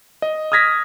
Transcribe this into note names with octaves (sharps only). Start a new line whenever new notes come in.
D#5
D#6 F6 G#6 A#6 B6